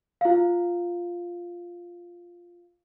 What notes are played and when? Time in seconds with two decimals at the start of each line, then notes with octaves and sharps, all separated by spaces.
0.21 F4 F5